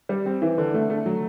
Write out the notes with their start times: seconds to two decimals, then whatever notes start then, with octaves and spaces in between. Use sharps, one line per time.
0.09 G3
0.26 C4
0.42 E3
0.58 D3
0.74 A3
0.90 A3
1.06 F#3